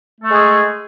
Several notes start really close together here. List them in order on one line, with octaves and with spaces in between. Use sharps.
A3 A4 G#3 G#4